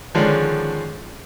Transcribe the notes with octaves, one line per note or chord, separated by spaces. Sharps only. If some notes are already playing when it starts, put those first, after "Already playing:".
D3 D#3 F3 G#3 C#4 D4